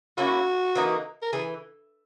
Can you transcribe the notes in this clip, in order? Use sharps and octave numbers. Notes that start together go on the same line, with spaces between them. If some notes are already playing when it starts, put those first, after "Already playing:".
A#3 C#4 E4 F#4
E3 A#3 D#4
A#4
E3 G#4